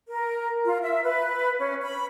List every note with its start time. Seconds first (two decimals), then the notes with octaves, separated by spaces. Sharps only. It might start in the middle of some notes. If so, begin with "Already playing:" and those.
0.08 A#4
0.64 F4
0.83 E5
1.04 B4
1.59 C#4
1.82 B5